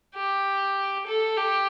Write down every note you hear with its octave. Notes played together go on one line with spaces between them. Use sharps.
G4
A4
G4